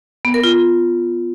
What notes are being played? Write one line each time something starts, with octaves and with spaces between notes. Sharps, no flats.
B3
A#4
F4